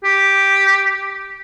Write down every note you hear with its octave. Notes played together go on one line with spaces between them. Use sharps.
G4